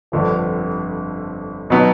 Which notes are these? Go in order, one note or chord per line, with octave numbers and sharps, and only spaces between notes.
G1 F2 D3 F3
B2 F#3 B3 D#4